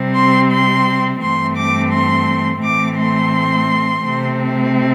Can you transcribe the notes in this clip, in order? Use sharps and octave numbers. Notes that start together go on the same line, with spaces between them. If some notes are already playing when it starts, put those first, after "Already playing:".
Already playing: C3 G3 C4
C6
C6
G2 E3 A3 C4 C6
D6
C6
A2 E3 A3 C4 D6
C6
C3 A3 C4